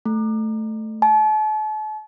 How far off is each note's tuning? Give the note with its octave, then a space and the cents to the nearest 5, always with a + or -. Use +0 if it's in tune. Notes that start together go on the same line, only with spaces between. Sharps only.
A3 +0
A5 -40